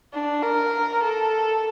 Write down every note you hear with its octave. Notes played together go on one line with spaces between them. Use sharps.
D4
A#4
A4